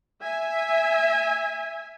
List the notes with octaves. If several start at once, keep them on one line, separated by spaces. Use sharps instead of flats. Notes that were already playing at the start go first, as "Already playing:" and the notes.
E5 G#5